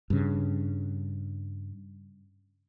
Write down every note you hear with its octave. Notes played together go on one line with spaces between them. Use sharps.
G2 C#3